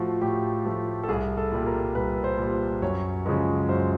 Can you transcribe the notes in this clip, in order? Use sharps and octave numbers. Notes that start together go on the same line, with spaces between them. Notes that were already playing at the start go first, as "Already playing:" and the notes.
Already playing: A2 F3 A3 F4 F#4
A2 G4
F3 A3
A4
C2 G#4
A4
A#2 G3
A#4
C2 B4
C5
A#2 G3
F#2 C#5
C#3 F3 G#3
F#2 C5